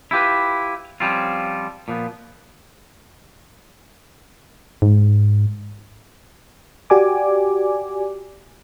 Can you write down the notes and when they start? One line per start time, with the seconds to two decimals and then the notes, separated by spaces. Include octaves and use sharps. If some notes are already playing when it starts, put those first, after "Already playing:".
0.11 E4 F4 G4 B4
1.00 F3 G3 C4 C#4 F4
1.88 A#2 F3 B3
4.82 G#2
6.90 F#4 G4 D5 G#5 D6